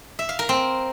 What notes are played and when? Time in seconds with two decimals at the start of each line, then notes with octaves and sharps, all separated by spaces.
0.19 E5
0.29 F5
0.39 A#4
0.49 C4